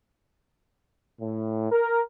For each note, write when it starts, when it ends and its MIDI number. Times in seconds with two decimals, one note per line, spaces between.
1.20 1.69 45
1.70 2.01 70